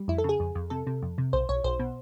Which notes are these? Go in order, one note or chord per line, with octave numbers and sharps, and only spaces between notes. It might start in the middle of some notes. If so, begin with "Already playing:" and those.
Already playing: G3
F2 E4
A4
C#3 G#4
F2
F2
C3 A4
C3
F2
C3
B1 C5
B1 C#5
B1 C5
B2